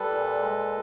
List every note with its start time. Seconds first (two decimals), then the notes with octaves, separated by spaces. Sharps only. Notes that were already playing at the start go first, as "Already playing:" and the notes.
Already playing: G3 A4 B4
0.10 A#2
0.39 G#3